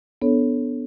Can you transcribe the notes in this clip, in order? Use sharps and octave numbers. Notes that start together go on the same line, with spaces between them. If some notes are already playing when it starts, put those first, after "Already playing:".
B3 D4 A4 C#5